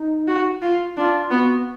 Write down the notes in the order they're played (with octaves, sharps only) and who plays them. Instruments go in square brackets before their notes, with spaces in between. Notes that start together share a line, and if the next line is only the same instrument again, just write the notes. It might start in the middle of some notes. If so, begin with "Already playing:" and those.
Already playing: [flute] D#4
[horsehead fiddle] F#4
F4
[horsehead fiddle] D4 [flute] F4
[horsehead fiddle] B3 [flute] F#4